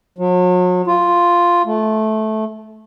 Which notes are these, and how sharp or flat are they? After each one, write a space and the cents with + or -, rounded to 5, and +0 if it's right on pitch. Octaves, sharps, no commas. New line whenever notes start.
F#3 -40
F4 +0
A3 -15